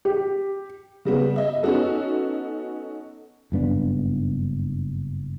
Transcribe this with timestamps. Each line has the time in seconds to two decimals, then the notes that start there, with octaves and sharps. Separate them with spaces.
0.05 G4
1.05 C#3 G3 B3
1.36 D#5 E5
1.63 B3 C#4 D#4 F#4 A4
3.52 F#1 G2 B3 D4